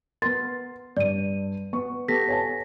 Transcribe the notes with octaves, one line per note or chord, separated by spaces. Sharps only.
B3 A#4 C6 A6
G2 D5 D#7
B3 C#6
B3 G4 A4 A#6 B6
C#5 G#5 A5